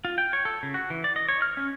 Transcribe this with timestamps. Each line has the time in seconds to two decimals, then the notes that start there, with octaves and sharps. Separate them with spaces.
0.05 F4
0.18 G5
0.33 C#5
0.45 A4
0.63 C#3
0.74 F#4
0.90 E3
1.04 D5
1.16 D#5
1.29 C#5
1.42 F6
1.57 C#4